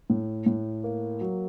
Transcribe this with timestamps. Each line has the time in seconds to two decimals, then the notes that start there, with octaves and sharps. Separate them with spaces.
0.10 A2
0.46 A2
0.84 A#3
1.21 F#3